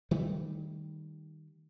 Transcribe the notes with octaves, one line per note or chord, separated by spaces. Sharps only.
D#3 G3 A3